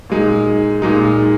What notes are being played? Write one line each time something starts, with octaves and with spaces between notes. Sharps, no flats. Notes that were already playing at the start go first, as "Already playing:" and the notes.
A#2 G#3 D#4
A#2 G#3 D#4